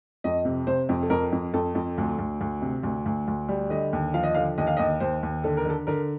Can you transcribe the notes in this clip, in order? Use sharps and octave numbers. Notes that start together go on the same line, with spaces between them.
F2 D#5
C3
C3 C5
F2
A4
F2 A#4
F2
F2 A4
F2
D2
D2
D2
C3
D2
D2
D2
G3
D3 D#5
D#2
F3 F5
D#5
D3 F5
D#2 D#5
F5
D#2 D#5
D#2 C5
D#2
D3 A4
A#4
D3 A4
D3 A#4